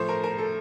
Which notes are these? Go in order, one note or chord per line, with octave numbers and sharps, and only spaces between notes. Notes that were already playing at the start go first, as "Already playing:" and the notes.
Already playing: A2 F3 A3 C5
A#4
A#4
A4